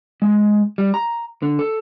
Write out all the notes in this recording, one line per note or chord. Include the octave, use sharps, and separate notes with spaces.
G#3
G3
A#5
D3
A4